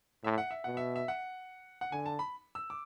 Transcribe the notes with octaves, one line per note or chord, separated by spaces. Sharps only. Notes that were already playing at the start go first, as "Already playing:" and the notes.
A2 E5
F#5
E5
B2 F#5
E5
E5
F#5
F#5
D3 G#5
A5
B5
E6
D6